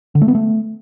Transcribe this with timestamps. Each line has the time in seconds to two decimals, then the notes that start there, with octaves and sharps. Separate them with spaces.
0.15 D3
0.22 A3
0.28 B3
0.35 A3